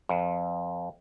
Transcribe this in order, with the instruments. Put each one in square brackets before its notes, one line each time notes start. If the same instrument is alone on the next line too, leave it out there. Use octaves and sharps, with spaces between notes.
[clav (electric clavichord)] F2